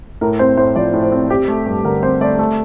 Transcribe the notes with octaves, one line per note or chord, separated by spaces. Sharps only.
A2 A#4
C4 C5
A2 C5
F3 D5
A2
C5
C4
C4 G4
A3
G2
D3 A#4
C4 C5
A3 D5
A3